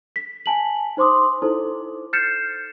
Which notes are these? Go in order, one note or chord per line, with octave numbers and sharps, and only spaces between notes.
B6
G#5 A5 F#7
D#4 C5 C6 D6 D#6
D#4 E4 A4 C5
F6 G6 A6 C7 C#7 E7